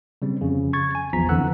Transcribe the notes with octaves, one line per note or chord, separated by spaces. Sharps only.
C#3 G3 C4
F2 C#3
C#6 G#6 A6
G#5
A1 E2 F3 A#5 B6
F2 D3 E3 F#5 E6 F#6